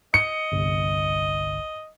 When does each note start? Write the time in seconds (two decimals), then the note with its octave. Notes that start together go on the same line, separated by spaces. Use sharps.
0.14 D#5 C#7
0.52 G1 C2